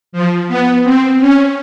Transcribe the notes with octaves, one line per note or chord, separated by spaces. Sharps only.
F3
B3
C4
C#4